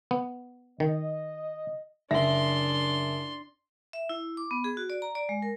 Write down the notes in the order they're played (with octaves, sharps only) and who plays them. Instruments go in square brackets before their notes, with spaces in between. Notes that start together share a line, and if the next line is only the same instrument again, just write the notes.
[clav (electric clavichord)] B3
[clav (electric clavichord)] D#3 [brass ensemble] D#5
[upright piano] F#1 E5 A#6 [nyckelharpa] D4 C6
[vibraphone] E5
E4
D6
B3
G#4
F#4
D5
A#5
D5
G#3
A#4